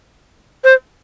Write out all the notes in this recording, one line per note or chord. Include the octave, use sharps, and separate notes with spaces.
C5